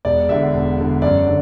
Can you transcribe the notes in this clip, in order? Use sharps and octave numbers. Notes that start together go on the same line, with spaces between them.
E1 D5
E2 D3 E5
E1
E2 D3
F#2 D5
D3